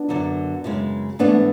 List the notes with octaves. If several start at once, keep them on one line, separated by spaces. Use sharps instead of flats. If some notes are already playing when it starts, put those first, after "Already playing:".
Already playing: B3 D4
F#2 D3 F#3
F#2 C#3 G#3
G#2 E3 A3 B3 D4